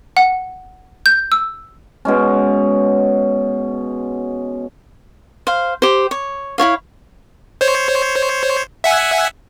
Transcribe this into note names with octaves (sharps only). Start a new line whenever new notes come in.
F#5
G6
E6
B2 G#3 C#4
C5 F5
G4 C5
C#5
E4 F4 C#5 F5
C5 C#5
E5 F#5 G#5